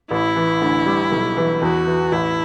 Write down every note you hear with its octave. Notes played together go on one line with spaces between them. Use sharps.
A1 E4
E3
D2
G3
B1
E3
E2 F#4
E3
A1 E4